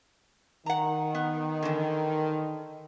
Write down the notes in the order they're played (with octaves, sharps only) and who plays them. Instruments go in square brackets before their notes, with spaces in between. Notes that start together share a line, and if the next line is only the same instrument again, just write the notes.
[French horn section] D#3 [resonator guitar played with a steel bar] F#5 A#5
[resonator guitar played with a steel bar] B3
D3 E3